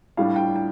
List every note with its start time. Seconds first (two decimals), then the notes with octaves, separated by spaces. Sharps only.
0.17 A2 G3 D4 F5
0.36 G5
0.56 G5